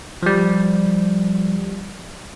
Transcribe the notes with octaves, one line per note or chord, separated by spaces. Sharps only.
F3 G3